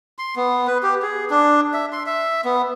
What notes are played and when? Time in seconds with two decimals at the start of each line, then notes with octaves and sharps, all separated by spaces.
0.19 C6
0.36 B3
0.67 B4
0.83 G4
1.02 G#4
1.30 D4
1.74 E5
1.92 C6
2.06 E5
2.45 B3